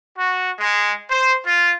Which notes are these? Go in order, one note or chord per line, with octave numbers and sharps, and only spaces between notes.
F#4
G#3
C5
F4